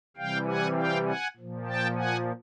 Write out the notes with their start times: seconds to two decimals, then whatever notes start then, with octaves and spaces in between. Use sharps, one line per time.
0.17 C3 E3 G3 F5 G5
0.47 F#5 G#5
0.76 F5 G5
1.07 F#5 G#5
1.37 A#2 F3
1.67 G5 A5
1.96 F#5 G#5